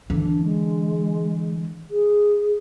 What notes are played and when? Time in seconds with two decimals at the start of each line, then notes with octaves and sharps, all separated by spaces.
0.10 D3 E3 D4
0.44 G#3
1.91 G#4